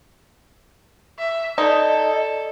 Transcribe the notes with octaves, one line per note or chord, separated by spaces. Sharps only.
E5
D#4 A4 D5 D#5